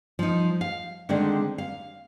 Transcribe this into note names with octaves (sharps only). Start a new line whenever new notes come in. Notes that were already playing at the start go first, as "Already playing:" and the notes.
F3 D#4
F5
D3 D#3 G#3 C4 D4
F5